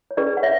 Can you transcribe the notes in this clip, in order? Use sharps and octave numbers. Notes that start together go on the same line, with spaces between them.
C#5
C#4 G#4 B4 D5
F#5
C#5 E5